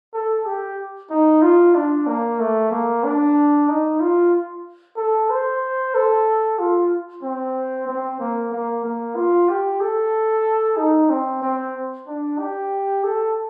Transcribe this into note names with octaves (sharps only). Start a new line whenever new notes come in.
A4
G4
D#4
F4
D4
A#3
A3
A#3
D4
D#4
F4
A4
C5
A4
F4
C4
C4
A#3
A#3
A#3
F4
G4
A4
D#4
C4
C4
D4
G4
A4